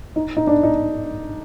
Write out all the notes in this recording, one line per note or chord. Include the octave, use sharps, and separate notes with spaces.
D#4
D#4
D4
D#4